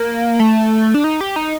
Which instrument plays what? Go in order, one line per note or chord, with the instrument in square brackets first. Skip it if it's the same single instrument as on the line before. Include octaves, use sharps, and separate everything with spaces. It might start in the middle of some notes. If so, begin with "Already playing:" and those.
Already playing: [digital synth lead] A#3
A3
D4
D#4
G4
D#4